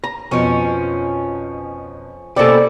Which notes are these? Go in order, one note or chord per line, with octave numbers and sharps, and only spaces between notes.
A#5
F2 B2 F3 C#4 C#6
B2 A#3 C#4 E4 G4 A4 C5 D5